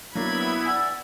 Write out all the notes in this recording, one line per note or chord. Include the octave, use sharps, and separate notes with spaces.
F#3 A#3 B3 D4 E4 B5 G#6
D5 F#5 G#5 E6